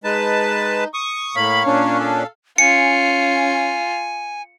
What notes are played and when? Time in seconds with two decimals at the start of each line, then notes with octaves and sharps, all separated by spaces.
0.04 G#3 D#4 B4 A5
0.94 C#6 D#6
1.36 A2 A#3 C#5 F5 B5
1.66 A#2 C#4 D4
2.00 A4 F5
2.58 C#4 F4 G#5 C#7